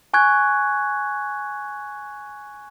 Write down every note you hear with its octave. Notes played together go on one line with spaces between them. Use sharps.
G#5 C#6 F#6 G#6